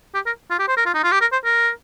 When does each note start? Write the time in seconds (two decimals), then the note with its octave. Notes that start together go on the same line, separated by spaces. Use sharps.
0.14 G4
0.26 A#4
0.50 F4
0.59 G4
0.68 C5
0.77 A#4
0.85 F4
0.94 D#4
1.03 F4
1.12 G4
1.21 A#4
1.32 C5
1.45 A#4